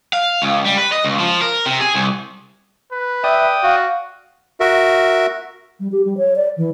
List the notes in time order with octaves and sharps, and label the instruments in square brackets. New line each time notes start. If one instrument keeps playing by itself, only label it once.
[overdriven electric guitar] F5
C#2
G3
B4
D#5
C#2
F3
A#4
C3
G#4
C2
[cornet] B4
[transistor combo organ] D5 G5 D#6 [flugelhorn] E5
[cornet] F#4 [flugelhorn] F5
[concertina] F#4 A#4 E5
[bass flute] G3
G4
G3
C#5
D5
E3